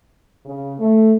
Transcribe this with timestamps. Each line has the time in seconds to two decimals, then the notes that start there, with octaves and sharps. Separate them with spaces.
0.46 C#3
0.79 A3